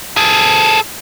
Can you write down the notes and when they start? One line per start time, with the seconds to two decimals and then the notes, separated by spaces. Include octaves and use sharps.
0.17 G#4 A4